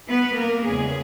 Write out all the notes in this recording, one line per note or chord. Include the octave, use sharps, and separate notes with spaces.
B3 B4
A#3 A#4
E2 C#3 G#3 G#4